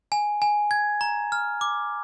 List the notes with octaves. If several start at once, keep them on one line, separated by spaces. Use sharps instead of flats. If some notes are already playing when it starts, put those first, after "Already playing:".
G#5
G#5
G#6
A#5
F6
D6